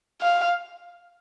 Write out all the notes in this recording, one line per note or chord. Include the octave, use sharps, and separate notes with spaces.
F5